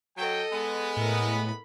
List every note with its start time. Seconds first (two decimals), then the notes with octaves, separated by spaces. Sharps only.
0.18 F#3 A4 D#5 G5
0.52 G#3 B3
0.97 A2 E4 A#4
1.30 B5